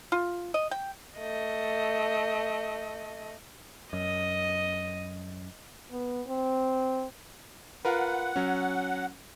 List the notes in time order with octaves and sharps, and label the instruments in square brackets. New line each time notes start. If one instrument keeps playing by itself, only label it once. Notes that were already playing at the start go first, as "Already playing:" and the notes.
[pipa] F4
D#5
G5
[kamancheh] A3 D#5
[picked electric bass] F#2 [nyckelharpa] D#5
[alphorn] B3
C4
[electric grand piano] F4 A#4 B4 [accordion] F#5
[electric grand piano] F#3 C#4